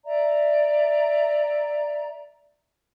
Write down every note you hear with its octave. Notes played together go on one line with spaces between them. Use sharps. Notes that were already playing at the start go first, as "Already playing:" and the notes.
D5 E5 A#5